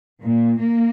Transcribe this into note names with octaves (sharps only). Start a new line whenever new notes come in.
A#2
A#3